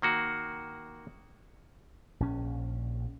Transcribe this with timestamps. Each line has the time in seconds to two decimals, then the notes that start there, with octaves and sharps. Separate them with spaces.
0.02 D#3 A#3 F#4
2.20 A#1 C#4